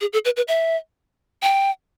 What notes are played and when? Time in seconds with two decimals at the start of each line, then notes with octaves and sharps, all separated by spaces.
0.01 G#4
0.13 A4
0.25 B4
0.37 B4
0.48 E5
1.43 G5